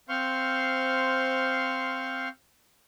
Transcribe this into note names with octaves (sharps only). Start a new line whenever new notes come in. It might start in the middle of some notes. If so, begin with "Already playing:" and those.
C4 C5 F5 C6 C#6 F6